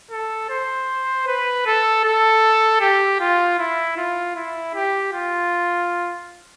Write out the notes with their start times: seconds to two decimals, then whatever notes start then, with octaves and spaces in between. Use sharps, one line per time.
0.11 A4
0.50 C5
1.27 B4
1.66 A4
2.05 A4
2.81 G4
3.20 F4
3.58 E4
3.97 F4
4.35 E4
4.74 G4
5.13 F4